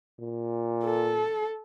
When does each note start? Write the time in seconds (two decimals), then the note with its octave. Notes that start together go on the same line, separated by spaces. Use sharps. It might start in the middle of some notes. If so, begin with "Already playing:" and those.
0.19 A#2
0.85 A4